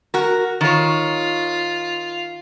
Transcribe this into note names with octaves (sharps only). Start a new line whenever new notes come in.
F#4 A#4
D#3 F4 C#5